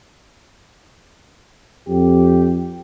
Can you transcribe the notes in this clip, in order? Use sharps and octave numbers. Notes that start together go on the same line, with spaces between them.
F2 G4